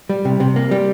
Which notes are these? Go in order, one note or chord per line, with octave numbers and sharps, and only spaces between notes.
G3
C3
C3
A#3
G3